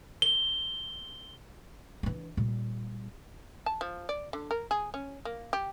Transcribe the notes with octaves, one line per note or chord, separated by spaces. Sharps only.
G7
E3 D4
A#2 G3
A5
F3
D5
D3
A#4
G#4
C#4
A#3
G4